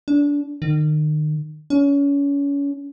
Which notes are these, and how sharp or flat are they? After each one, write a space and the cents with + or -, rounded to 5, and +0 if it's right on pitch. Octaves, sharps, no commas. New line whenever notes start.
D4 -25
D#3 -35
C#4 +30